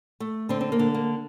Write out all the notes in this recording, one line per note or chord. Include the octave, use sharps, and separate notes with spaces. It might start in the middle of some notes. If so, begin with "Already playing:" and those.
A3
D3 C4
C4
A#3
D3
A#3